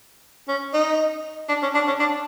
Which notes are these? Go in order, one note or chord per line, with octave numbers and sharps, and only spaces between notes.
C#4
D#4
D4
C#4
D4
C#4
D4